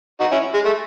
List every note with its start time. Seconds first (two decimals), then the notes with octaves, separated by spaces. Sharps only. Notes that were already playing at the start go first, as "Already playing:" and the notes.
0.20 D#4 F#4
0.31 C#4 E4
0.54 G#3
0.65 A3